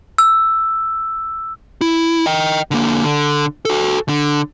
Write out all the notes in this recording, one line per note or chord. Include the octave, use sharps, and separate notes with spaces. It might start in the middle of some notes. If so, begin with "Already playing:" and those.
E6
E4
D#5 G5
D3 A#3
D3
F#4 A4
D3